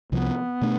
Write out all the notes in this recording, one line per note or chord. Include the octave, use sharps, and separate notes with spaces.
C2 C3 F3 B3
B2 A3 D4